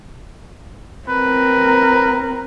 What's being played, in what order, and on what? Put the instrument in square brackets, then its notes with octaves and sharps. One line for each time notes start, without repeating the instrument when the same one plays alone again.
[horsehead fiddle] C4 A#4 [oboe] B4